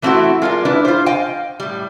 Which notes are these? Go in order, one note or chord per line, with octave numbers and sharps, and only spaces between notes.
E3 A3 C4 D#4 E4 F#4
G#3 F4 A#4 D5
E3 D4 E4 B4
F4 C5
D#5 F5 G5 G#5
A2 G3